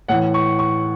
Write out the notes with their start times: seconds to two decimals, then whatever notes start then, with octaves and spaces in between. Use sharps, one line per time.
0.08 A2 E3 F#5
0.34 C#6
0.59 C#6